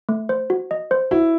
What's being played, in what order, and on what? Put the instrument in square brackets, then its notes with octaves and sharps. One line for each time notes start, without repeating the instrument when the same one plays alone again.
[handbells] A3
C5
F#4
D#5
C5
[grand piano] E4 [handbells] F#4